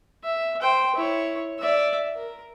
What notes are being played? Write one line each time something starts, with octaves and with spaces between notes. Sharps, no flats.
E5
C5 G5
E4 C#5
D5 E5
A#4